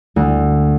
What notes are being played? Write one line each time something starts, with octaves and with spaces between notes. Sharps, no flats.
D2